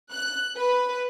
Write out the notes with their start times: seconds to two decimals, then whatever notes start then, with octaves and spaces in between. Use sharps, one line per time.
0.13 F#6
0.58 B4